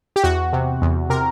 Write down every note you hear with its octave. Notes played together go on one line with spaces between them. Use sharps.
G4
E2 F#4
C3
E2
C3 A#4